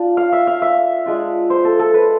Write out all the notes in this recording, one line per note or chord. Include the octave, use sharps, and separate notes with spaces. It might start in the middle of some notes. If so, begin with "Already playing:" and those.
Already playing: D4 F4
F5
E5
F5
E5
G#3 D4 F4
C5
A4
A4
B4